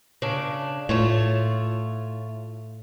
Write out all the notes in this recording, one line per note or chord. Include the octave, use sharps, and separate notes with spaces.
C#3 D4
A2 A3 F4 C#5